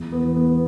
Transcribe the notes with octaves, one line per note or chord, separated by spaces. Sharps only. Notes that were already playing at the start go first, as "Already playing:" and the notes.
Already playing: E2
B3
E3
B3